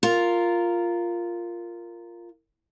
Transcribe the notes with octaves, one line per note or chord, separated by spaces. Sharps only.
F4 A#4